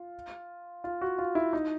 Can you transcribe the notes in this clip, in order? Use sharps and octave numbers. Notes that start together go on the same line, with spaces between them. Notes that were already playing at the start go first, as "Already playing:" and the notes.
Already playing: F4
F4
F#4
F4
E4
D#4